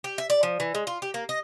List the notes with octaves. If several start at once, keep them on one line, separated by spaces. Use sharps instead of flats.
G4
E5
D5
F3
E3
G#3
F4
G4
A#3
D#5